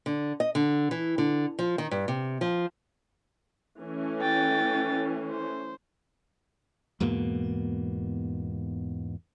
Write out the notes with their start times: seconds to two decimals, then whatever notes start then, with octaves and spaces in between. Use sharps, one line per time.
0.06 D3
0.40 D#5
0.55 D3
0.91 E3
1.18 D3
1.59 F3
1.78 D#3
1.91 G2
2.08 C3
2.41 F3
3.80 E3 A3 C#4
4.21 G5 A6
5.30 C5
7.00 E2 G#2 B2 A#3